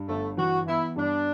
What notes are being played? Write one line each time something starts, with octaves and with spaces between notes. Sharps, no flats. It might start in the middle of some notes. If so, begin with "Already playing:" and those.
Already playing: G2
G1 A3
E3 F#4
B3 E4
G2 D4